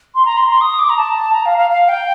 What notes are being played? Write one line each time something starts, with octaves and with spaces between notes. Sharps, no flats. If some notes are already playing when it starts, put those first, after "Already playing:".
C6
A#5
C6
C6
D#6
D6
A#5
A5
A#5
F5
F5
F5
G5